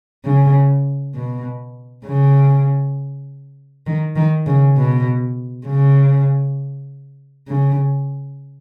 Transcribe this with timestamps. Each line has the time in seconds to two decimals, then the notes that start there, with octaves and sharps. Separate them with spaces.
0.25 C#3
1.15 B2
2.05 C#3
3.86 D#3
4.16 D#3
4.46 C#3
4.77 B2
5.67 C#3
7.48 C#3